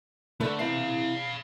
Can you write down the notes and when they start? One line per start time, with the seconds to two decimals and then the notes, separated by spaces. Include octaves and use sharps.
0.40 D3 A3 A4 B4
0.59 C3 E3 F5 B5